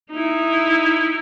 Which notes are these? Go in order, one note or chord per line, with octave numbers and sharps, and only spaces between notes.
D#4 E4